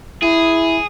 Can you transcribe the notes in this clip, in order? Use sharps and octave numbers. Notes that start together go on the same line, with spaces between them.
E4 G#4